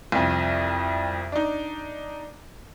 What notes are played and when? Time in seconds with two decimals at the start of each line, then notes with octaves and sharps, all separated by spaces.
0.12 C2 F2
1.32 D4 D#4